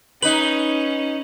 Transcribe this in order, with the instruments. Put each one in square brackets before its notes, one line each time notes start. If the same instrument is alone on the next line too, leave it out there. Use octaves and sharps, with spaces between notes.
[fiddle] C#4 [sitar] D#4 B4 [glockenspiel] F#7